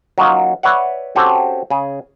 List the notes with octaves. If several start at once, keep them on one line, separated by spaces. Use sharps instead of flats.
F#3 A#3 C#4 D#4 F4
B4 C#5 D5 E5 F#5
C4 C#4 F#4 G4 A4 C5
C#3 G#4